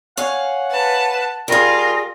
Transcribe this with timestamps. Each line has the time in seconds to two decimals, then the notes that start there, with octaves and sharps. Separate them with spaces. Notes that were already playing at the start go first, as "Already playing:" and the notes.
0.17 C#5 F5 F#5 G#5
0.71 B4 A5
1.48 G3 F4 G#4 A#4